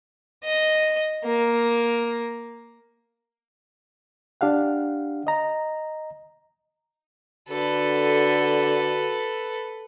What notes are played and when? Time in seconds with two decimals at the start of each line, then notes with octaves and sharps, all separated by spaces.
0.44 D#5
1.25 A#3
4.41 D4 G4 F5 F#5
5.27 D#5 A#5
7.49 D3 F#4 A4 B4